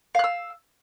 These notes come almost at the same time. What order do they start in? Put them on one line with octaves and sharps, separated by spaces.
F5 F#6 E6